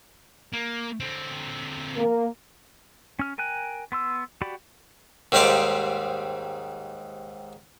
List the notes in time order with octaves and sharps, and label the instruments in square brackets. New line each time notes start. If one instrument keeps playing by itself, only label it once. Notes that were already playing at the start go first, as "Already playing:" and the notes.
[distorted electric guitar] A#3
D3 C4
[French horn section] A#3 A#4
[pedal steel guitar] C#4 F6
A#4 G5 G#5 F#6
B3 C6 E6
F#4 G4 D5 B5
[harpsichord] D#2 G#2 G3 C5 F5 D6